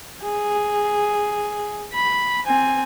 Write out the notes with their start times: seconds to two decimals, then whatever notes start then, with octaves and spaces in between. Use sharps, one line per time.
0.23 G#4
1.94 B5
2.46 C4 G#5